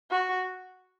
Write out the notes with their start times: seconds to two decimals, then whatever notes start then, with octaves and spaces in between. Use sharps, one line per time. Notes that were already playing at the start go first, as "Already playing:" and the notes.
0.11 F#4